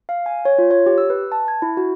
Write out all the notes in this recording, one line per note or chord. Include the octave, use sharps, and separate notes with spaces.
F5
G#5
C#5
F4
C#5
G4
E6
B4
A5
G#6
E4
F#4